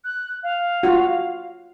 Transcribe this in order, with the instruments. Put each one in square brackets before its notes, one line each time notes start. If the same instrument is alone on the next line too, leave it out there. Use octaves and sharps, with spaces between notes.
[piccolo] F#6
F5
[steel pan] F4 F#4